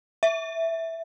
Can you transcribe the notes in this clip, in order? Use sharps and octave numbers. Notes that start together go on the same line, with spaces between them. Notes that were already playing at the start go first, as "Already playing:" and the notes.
E5